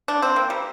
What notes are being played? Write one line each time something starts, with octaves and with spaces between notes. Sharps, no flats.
D4
C4
A#3
G3